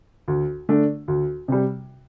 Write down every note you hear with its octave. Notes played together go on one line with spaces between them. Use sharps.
D2
D3 A3 D4
D2
C3 G3